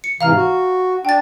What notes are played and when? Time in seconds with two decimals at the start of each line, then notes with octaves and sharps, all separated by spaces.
0.04 C#7
0.21 G#2 C3 E3 F5 A#5 F6
0.35 F#4
1.05 D4 G5 A6